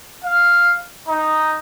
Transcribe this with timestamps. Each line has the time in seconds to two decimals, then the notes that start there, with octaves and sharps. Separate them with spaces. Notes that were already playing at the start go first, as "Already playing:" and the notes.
0.25 F5
1.08 D#4